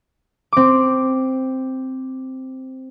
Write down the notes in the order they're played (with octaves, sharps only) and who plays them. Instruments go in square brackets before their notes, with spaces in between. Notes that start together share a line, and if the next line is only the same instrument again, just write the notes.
[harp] C4 D6